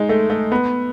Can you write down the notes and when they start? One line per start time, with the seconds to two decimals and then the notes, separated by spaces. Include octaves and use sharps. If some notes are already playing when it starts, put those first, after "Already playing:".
Already playing: G#3 D#4
0.09 A3
0.30 A3
0.52 B3